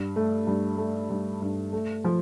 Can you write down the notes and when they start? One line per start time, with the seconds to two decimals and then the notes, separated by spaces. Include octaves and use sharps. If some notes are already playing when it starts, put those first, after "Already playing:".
Already playing: G2
0.16 A3
0.47 G2
0.78 A3
1.10 G2
1.42 G2
1.73 A3
2.04 F3